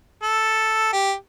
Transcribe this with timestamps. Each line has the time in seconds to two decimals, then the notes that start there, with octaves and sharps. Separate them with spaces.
0.23 A4
0.93 G4